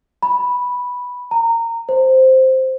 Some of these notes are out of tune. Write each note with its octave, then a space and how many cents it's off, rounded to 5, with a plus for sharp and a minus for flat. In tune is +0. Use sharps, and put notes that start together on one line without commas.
B5 -5
A#5 -20
C5 +0